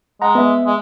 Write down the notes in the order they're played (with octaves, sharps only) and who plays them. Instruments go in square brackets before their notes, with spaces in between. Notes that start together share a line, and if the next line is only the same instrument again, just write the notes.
[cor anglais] G#3 [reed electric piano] F#5 A#5
[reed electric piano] B3 E5
[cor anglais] G#3